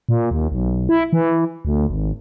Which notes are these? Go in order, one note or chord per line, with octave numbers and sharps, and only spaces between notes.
A#2
D#2
B1
E4
E3
D2
G#1